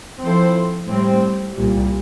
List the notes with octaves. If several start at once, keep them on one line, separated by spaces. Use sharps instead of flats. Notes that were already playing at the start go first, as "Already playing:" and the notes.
F3 C4 E4 A4 C5
A2 G3 C4
C2 A#2 G3